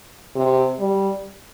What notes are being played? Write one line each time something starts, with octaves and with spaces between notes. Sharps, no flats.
C3
G3